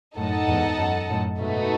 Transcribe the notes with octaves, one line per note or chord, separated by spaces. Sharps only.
F#2 A2 D#4 A4 D#5 F#5 A5
E2 G#2
F#2
F#2 A2
G#2 B2 A3 D#4 F#4 B4